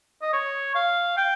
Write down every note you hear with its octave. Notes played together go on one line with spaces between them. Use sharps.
D#5
C#5
F5
G5